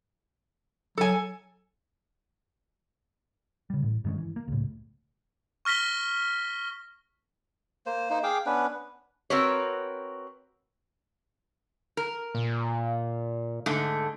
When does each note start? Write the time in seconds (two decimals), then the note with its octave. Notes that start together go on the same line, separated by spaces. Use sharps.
0.98 F#3 A4 G#5
3.70 C#3 G3
3.83 A1 A2
4.04 G2 D#3 G#3 C#4
4.18 E3
4.36 A#3
4.48 C#2 A2
5.65 C#6 F6 A#6 B6 G7
7.86 A#3 C5
8.10 A#3 D#4 C5
8.24 G#4 F5 G5 D6
8.46 B3 C#4 D4 B4
9.30 C4 F#4 A#4 B4 C#5
11.97 A#4
12.35 A#2
13.66 G#2 D3 A3